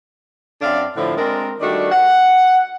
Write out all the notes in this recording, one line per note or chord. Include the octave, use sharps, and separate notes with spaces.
F#2 C4 D4 D5 E5 F5
A2 D3 F3
G#3 C4 D4 A#4
D#3 G3 A3 D4 F#4 D5
F#5